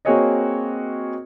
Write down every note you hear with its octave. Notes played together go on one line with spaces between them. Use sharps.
A#3 C4 F#4 G#4 C#5 D#5